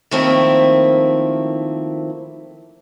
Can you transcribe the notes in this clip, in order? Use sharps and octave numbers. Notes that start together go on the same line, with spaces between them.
D#3 F3 A3 A#3 C4 E4